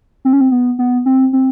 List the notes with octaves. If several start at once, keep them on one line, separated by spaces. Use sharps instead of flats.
C4
C#4
C4
B3
B3
C4
C4